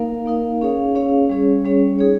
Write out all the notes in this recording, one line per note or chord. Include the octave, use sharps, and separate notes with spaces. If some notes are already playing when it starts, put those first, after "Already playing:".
Already playing: A#3 D#4 A#4 F5
A#3 D#4 A#4 F5
C#4 G#4 C#5 F5
C#4 G#4 C#5 F5
G3 C#4 G#4 C#5
G3 C#4 G#4 C#5
D#4 G#4 C#5